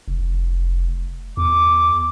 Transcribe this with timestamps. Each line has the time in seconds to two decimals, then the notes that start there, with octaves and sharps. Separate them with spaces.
0.08 F1
1.37 E2 D6